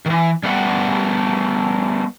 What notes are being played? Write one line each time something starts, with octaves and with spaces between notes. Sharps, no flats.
D#3 E3
G3 A3 B3 F5 F#5